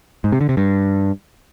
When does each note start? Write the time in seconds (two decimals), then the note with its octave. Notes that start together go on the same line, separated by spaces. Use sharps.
0.24 G#2
0.32 C3
0.41 D3
0.49 C3
0.57 G2